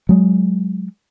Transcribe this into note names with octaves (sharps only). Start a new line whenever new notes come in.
F#3 G#3